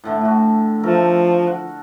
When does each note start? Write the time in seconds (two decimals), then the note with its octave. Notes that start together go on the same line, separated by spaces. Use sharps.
0.04 A2 D3 A3
0.21 A2 F#4
0.83 F3 A3 A4 A#4
1.47 F#5